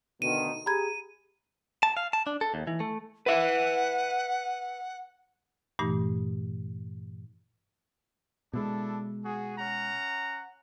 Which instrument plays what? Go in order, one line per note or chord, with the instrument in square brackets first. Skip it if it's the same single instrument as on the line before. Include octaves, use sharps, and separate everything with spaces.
[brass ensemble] D2 B2 D#3 [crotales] D#7
[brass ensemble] G4 G#4 [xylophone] A#5 B5 G#6
[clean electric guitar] A5
F5
A5
D4
A4
D#2
E3
A3
[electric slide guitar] B4 E5 [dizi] F#5
[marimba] G2 A#2 E3 A3 D#4 G4
[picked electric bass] B2 G#3 [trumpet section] D4 E4 A4
[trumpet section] F#4 G#4
C#4 F#5 A#5